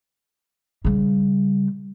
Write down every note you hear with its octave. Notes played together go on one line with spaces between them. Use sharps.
C#3 G3